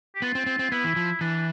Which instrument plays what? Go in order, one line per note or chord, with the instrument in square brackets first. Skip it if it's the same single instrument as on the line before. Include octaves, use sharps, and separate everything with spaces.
[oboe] G4
[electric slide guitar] B3 [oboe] F4
[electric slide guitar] C4
C4
C4
[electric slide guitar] B3 [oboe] E4
[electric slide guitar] E3
F3
[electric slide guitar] E3 [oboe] D4